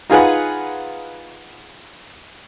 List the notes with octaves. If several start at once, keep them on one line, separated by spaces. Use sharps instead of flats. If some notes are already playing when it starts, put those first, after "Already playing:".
D#4 F4 G#4 B4 F#5